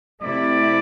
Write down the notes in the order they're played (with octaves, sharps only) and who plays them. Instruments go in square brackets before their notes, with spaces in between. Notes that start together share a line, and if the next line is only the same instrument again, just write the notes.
[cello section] C3 A3 E4 [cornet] D5